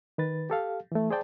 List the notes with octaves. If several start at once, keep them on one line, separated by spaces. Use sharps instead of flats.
D#3 B4 A6
G4 A4 F5
E3 A3
G#4 C5 D5 G5 A5